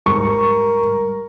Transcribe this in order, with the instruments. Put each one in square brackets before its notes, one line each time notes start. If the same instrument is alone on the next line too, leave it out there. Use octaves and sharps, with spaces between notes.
[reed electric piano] G#2 G3 [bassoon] A#4 [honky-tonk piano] C#6